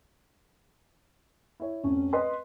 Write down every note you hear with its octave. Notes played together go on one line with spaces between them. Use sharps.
E4 C#5
F1 C#4
B4 D#5 C6